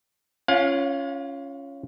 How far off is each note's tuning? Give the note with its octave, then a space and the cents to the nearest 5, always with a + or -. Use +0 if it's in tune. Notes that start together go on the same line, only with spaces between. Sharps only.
C#4 +0 F4 -20 F5 +35